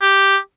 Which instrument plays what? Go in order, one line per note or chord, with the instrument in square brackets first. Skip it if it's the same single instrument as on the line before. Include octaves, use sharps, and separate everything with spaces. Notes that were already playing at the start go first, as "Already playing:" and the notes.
[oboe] G4